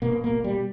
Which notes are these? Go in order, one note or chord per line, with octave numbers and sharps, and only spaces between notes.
B2 A#3
A#3
B2
G3